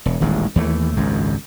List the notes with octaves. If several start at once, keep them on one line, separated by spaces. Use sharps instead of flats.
E1
D#1 A1 D#3 G#3
D#2 E3 A3
G#1 C#2 F#2